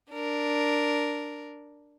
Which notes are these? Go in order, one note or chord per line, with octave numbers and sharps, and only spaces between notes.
D4 A#4